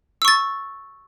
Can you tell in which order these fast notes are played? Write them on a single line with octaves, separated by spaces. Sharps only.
E6 C#6 A6